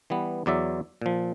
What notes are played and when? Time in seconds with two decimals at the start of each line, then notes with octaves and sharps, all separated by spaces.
0.10 E3 G3 B3
0.46 E2 F#3 D5 E5
1.02 A#2 F3